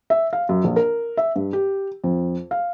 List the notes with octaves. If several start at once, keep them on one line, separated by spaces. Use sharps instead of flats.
E5
F5
F#2
A#1
A#4
E5
G2
G4
F2
F5